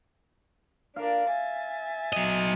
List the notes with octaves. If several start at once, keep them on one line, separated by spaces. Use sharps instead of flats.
D4 A#4 D5 F5
E5 G#5 A6
F#3 D#5